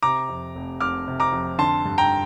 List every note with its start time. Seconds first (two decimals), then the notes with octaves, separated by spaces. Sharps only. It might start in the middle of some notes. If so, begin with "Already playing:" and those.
0.03 C3 A#5 D6
0.29 F2
0.55 F1
0.80 F1 D6 F6
1.08 C3
1.20 A#5 D6
1.32 F2
1.58 D3 A5 C6
1.85 G2
1.98 G5 A#5